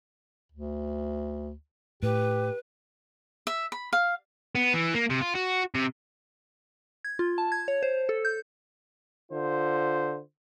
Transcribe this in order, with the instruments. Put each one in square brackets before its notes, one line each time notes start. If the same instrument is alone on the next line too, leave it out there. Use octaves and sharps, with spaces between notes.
[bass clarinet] D2
[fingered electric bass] A2 [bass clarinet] G4 [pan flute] B4
[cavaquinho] E5
B5
F5
[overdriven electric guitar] B3
E3
A#3
C3
F4
F#4
C3
[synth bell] G#6
F4
A5
G#6
C#5
C5
A4
G6
[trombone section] D3 F4 C5